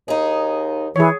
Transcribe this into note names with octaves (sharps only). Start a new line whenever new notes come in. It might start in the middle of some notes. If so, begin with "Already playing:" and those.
D#2 D#4 G#4
E3 G#4 C#5